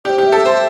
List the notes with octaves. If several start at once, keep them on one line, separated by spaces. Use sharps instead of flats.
G4 D5
C5
G4
E5
A4
C5